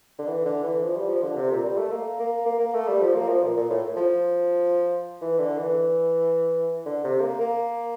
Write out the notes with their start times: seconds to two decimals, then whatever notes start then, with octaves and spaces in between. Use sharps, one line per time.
0.19 D3
0.27 E3
0.45 D3
0.64 E3
0.83 F3
0.96 G3
1.09 F3
1.23 D3
1.37 C3
1.51 A#2
1.65 G3
1.77 A3
1.91 A#3
2.20 A#3
2.46 A#3
2.60 A#3
2.74 A3
2.88 G3
3.02 F3
3.15 A#3
3.29 F3
3.43 A#2
3.57 A#2
3.70 A2
3.97 F3
5.21 E3
5.38 D3
5.58 E3
6.86 D3
7.04 C3
7.21 A#3
7.41 A#3